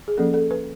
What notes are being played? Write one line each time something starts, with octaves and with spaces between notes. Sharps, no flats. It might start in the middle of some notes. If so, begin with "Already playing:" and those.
G#4
F3 A#3 C#4 A4
A4
B4